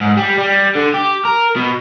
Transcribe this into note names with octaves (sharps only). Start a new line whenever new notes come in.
G#2
G3
G3
D3
G4
A#4
B2